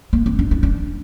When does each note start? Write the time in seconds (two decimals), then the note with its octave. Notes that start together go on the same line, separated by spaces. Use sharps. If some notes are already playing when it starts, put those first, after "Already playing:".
0.13 A#3
0.26 C4
0.39 D4
0.51 D#4
0.63 D4